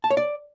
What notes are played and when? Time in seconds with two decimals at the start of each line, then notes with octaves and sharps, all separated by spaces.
0.04 A5
0.11 C#5
0.17 D5